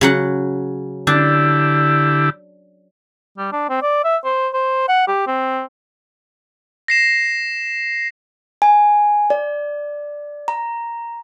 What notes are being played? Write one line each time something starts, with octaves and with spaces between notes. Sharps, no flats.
C#3 F#3 F#5
D3 D4 E4 G4
G3
D4
C4
D5
E5
C5
C5
F#5
G4
C4
A#6 C7 E7
G#5
D5
A#5